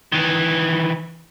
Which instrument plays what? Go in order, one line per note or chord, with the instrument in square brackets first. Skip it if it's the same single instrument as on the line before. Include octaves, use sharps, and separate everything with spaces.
[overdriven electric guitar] D#3 E3